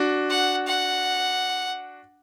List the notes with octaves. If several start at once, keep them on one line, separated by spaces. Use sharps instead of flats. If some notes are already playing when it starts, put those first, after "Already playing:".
Already playing: D4 F#4
F#5
F#5